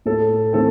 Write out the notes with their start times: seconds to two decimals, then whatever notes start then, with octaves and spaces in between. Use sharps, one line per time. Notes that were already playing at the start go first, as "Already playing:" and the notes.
0.05 A2 A4
0.53 E3 A3 C4 A4